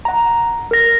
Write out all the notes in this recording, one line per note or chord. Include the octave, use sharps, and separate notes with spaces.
F#5 A#5
A#4 A#6